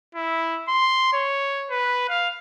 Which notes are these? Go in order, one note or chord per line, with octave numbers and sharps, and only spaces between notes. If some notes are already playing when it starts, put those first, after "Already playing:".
E4
C6
C#5
B4
F5